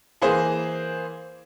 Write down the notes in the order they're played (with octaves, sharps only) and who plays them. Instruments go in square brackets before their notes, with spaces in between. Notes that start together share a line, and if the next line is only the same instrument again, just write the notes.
[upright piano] E3 A#3 G#4 C5